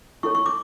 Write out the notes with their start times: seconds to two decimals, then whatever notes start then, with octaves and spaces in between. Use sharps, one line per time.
0.23 E4 A4 C#5 C#6
0.35 C#6
0.46 D6